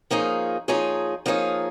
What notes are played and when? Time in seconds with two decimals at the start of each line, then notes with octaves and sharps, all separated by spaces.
0.11 F3 A#3 D#4 G#4 C#5
0.68 F3 A#3 D#4 G#4 C#5
1.26 F3 A#3 D#4 G#4 C#5